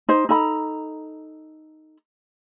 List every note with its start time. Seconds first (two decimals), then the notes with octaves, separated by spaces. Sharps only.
0.09 D#4 C5
0.29 D#4 A4 A#5 B5